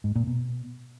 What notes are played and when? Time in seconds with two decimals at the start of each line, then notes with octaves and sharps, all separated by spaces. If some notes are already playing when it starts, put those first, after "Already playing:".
0.04 G#2
0.16 A#2
0.27 B2